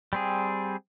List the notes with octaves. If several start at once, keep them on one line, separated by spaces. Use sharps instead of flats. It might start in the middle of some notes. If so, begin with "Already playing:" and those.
G3 C4 G#4